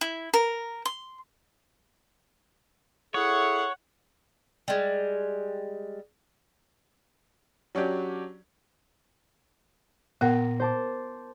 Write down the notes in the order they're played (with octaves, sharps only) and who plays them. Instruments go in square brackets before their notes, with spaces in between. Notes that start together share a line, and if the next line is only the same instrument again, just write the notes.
[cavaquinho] E4
A#4
C6
[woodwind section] E4 G#4 A4 [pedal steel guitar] C#5 [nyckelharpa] F#5
[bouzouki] G3 G#3
[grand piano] F#3 C#4 D4 G4
[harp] A#2 A#6 C7 [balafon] B3 F#5
[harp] C5 A5 D6